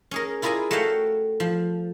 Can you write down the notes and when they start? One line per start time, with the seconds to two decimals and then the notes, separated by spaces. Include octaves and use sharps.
0.11 C#4 G#4 A#4
0.42 E4 F4 G#4 A#4 D5 G#5
0.71 A3 F#4 C#5 F5 G5
1.40 F3